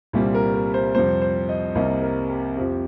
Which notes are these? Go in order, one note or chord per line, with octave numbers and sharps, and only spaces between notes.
C2 A#2 G3 C4 G4
A#4
A#4
C5
F2 C3 G3 C5
C5
D#5
C2 C3 G3 A#3 D#5
A#4
G4
F2 F3 C4 G4